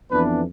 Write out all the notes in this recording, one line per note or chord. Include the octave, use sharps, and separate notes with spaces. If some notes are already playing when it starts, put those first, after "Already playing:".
F2 E3 B3 D4 B4